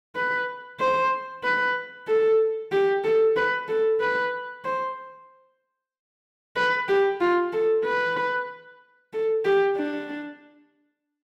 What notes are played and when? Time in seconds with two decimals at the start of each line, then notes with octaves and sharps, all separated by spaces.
0.16 B4
0.80 C5
1.44 B4
2.08 A4
2.72 G4
3.04 A4
3.36 B4
3.68 A4
4.00 B4
4.64 C5
6.56 B4
6.88 G4
7.21 F4
7.53 A4
7.85 B4
9.13 A4
9.45 G4
9.77 D4